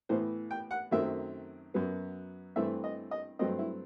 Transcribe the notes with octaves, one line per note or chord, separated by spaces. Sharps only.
A2 E3 B3 C5
G5
F#5
F#2 D#3 F#3 A3 C4 E5
F#2 F#3 B3
G2 E3 A3 C4 E5
D#5
D#5
G2 F#3 A3 C4 D#5
E4